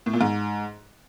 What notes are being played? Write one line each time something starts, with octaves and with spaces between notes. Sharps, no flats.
A2
A#2
G#2